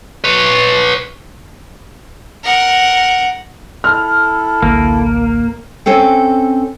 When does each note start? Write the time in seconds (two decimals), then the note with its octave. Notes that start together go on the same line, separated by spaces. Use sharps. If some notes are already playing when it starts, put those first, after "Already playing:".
0.24 B4 C#5
2.44 A#4 F#5
3.84 E4 A4 F6
4.62 A1 D2 A#3
5.86 C4 C#4 A4 G5